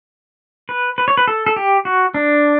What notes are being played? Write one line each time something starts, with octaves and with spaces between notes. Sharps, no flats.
B4
B4
C#5
B4
A4
A4
G4
F#4
D4